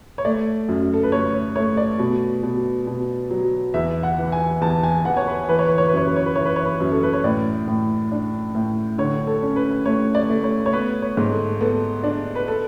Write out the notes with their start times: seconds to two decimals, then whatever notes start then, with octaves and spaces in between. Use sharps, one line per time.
0.18 C#5
0.25 A3 D5
0.69 F#2
0.93 A4
1.03 B4
1.12 A3 C#5
1.33 C#5
1.56 A3 C#5
1.77 D5
1.99 B2
2.43 B2
2.87 B2
3.31 F#3
3.74 E2 E5
4.03 F#5
4.18 E3
4.32 G#5
4.61 E2 A5
4.84 G#5
5.05 E2 F#5
5.17 C#5
5.27 B4
5.49 E3 B4
5.59 C#5
5.68 B4
5.78 C#5
5.88 B4
5.93 F#2 C#5
6.07 B4
6.16 C#5
6.26 B4
6.36 E3 C#5
6.45 B4
6.56 C#5
6.65 B4
6.80 F#2
6.91 A4
7.03 B4
7.13 C#5
7.24 A2 D5
7.68 A2
8.12 D4
8.55 A2
8.98 D3 C#5
9.27 A4
9.43 C#4
9.56 B4
9.86 A3 C#5
10.15 D5
10.30 A3
10.44 C#5
10.66 C#5
10.73 B3 B4
11.02 C#5
11.17 G#2
11.32 A4
11.61 B3 A4
12.04 D4
12.35 B4
12.48 A4